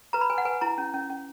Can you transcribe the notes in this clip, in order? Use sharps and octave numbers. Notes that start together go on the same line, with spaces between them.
B4 A#5
B5
B4 G#5
F#5
B4 G#5
E4 A#5
C#4
C#4
C#4